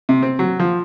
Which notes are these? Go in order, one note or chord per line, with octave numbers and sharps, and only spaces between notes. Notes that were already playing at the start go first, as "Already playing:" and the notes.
C3
C4
F#3
F3